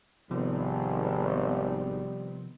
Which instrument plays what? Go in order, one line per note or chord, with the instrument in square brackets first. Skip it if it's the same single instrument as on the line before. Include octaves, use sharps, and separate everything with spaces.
[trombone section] G#1 [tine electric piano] C3 F3 [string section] D#3 B3 C4 [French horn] G3